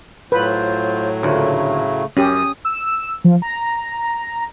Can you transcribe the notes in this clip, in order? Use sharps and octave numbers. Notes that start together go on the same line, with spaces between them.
A2 F#3 F4 B4 C5
D2 A#2 C#3 A3
F#2 C#4 G4 D#6
E6
F3
A#5